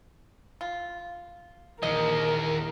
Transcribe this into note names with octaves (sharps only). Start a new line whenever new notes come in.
F4
A#1 D#2 E3 A#4 D#5 F#5